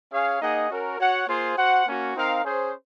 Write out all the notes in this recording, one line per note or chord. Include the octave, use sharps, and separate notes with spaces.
C#4 G#4 C#5 F5
A#3 D#4 G#4 D#5 F#5
C#4 F#4 A#4
F#4 C#5 F#5
A#3 F4 G#4 C5
F#4 C5 F#5
A#3 C#4 F#4
C4 D#4 A#4 F5
C#4 G#4 C5